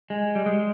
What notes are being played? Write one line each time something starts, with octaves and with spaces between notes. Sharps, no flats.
G#3
G3
G#3